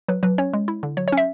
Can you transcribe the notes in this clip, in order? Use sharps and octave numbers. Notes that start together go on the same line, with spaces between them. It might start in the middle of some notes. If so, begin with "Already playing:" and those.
F#3 B4
F#3 B4
C#4 C#5
G#3
E4
D3
F#3 C#5
C#5
C#4
E5